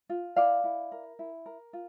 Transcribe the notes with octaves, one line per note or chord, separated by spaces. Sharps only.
F4
E4 D5 F5
E4
A#4
E4
A#4
F4